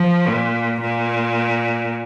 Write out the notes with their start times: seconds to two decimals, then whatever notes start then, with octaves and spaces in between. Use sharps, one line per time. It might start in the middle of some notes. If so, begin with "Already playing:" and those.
Already playing: F3
0.28 A#2
0.81 A#2